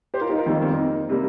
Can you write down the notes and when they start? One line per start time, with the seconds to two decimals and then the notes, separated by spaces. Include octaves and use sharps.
0.14 G4 C5
0.21 F4 A#4
0.29 D#4 G4
0.38 F4 A#4
0.46 F2 D#3 G3 A#3 D#4
0.62 C4
0.77 D#4
1.09 C3 G3 A#3